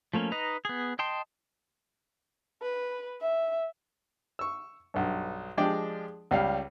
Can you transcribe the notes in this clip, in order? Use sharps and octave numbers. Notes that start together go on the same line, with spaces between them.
F3 A3 A#3 C#4
D#4 B4 D#5 A#5
B3 G#4
D#5 G5 A5 C6
B4
E5
C#6 E6
B1 G2
F3 G#3 D4 G4 D5 G5
C#2 G3 F5